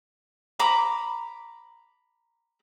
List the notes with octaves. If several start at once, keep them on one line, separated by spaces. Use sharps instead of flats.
A#5 B5 D6